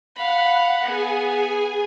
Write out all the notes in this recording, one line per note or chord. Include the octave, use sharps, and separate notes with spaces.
F5 F#5 B5
B3 G#4 G#5